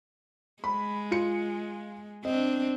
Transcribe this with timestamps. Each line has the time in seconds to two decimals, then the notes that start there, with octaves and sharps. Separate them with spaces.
0.64 G#3 B5
1.11 F4 C#7
2.25 C4 D4 D#5